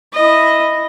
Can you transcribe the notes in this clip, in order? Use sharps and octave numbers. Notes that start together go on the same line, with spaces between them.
E4 D#5